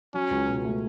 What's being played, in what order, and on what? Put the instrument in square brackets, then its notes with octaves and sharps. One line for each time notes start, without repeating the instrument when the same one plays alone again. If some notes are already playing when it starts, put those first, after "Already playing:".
[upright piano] F#3 [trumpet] C#4
[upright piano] C#2
B2
A3